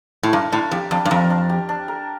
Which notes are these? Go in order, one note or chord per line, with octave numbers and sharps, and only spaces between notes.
A2
G2 A#4
A2 D4
F2 G4
F2 D4
G2
F2 A#4
D4
G4
D4
A#4